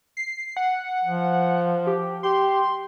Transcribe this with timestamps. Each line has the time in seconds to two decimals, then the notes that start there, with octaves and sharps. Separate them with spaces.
0.17 C7
0.57 F#5
1.04 F3
1.87 G4
2.23 G4 C6